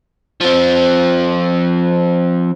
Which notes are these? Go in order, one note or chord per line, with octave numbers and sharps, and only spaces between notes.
F3 C4